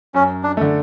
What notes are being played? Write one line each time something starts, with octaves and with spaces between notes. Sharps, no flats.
F#2 C#4
D4
D3 A3